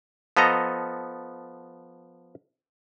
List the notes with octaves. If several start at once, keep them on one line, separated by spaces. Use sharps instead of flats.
F3 B3 A4 D#5 A#5